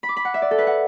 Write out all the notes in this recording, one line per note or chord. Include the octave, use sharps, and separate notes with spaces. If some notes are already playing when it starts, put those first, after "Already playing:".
B5
D6
B5
F#5
E5
D5
A4
B4
F#5